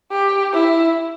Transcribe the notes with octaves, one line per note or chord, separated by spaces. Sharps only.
G4
E4